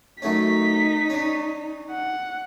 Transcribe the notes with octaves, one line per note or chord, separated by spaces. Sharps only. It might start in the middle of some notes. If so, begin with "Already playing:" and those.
F#2 A3 C#4 D#4 B6
C#4 D4
F#5